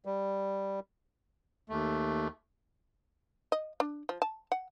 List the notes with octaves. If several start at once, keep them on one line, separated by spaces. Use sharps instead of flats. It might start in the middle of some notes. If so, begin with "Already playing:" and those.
G3
D#2 A3
D#5
D4
F3
A5
F#5